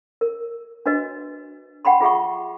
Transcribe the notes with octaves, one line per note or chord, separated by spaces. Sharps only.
A#4
D4 F#4 B4 D#5
G4 F#5 G5 B5 C6
F4 G#4 E5 F#5 C#6